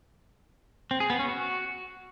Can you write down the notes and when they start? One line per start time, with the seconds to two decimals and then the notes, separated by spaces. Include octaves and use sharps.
0.91 C4
1.00 G#4
1.10 B3
1.19 C#4
1.29 F#4